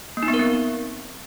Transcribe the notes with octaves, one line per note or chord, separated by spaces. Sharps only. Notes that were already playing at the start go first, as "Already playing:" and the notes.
A#3
D#4
B3
A#4
C4